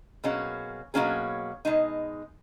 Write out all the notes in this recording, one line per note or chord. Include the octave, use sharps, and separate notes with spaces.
B2 F#3 A#3 C#4 G#4
B2 F#3 A#3 C#4 G#4
B2 G#3 D#4